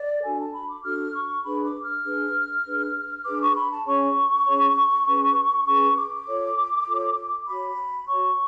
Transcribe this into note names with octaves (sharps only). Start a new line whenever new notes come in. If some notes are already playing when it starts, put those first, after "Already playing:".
Already playing: D5
D4 F#4 A4 G#5
A5
B5
D6
D4 F#4 A4 F6
C#6
D4 G#4 B4 B5
D6
F6
D4 G#4 B4
D4 G#4 B4
D4 G#4 B4 D6
C#6
B5
A5
C#4 G#4 C#5 C#6
C#4 G#4 C#5
C#4 G#4 B4
C#4 G#4 B4 C#6
D6
F4 A4 C#5
F4 A4 C#5
F#4 C#5 B5
F#4 C#5 C#6